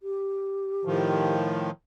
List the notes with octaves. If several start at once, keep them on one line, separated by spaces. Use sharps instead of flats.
G4
A2 D#3 F3